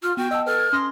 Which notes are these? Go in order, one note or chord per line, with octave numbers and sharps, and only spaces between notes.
F4 F6
B3 F#4 G5
D#5 F#5 A5 E6
A4 B4 F6
G#6
C#4 C6 D#6 A#6